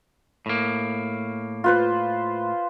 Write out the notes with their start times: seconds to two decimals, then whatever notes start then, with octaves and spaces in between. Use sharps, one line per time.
0.46 A2 A#3
1.64 F4 B4 C5